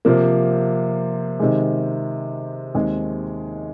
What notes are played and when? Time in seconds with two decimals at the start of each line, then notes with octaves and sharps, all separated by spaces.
0.05 C3 F3 A#3
1.40 C3 D#3 G#3
2.75 D#2 D#3 G#3 C4 G#4